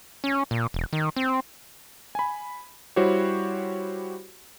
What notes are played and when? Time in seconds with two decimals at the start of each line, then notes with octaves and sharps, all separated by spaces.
0.24 C#4
0.51 A#2
0.74 E1
0.93 D#3
1.16 C4
2.15 G#5 B5
2.96 G3 E4 F#4 G4 C5 C#5